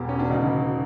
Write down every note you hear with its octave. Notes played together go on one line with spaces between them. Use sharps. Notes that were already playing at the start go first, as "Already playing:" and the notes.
Already playing: E1 E2 B2 G4
C#4
D4
E1 D2 C#3 D#4